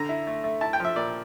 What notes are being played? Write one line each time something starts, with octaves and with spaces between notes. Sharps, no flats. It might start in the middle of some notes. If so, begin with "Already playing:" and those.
Already playing: D3 A#5
E4
A3
A3
E4 A5
G5
F3 E5
A#2 D5